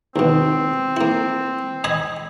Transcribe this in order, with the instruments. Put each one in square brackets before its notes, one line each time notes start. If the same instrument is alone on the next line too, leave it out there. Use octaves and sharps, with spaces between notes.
[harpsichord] D#2 B2 [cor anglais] C4
[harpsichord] A#3 E4
D#5 G#5 B5